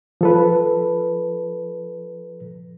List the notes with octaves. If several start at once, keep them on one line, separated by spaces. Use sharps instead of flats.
F3 A4 B4